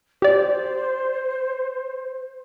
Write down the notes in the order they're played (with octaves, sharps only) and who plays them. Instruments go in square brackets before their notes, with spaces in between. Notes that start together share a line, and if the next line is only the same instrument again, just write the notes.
[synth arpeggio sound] G4 D5 [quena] C5